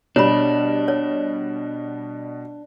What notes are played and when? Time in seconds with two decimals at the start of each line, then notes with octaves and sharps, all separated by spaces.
0.16 B2 G3 D4 C#5 B5
0.88 C#5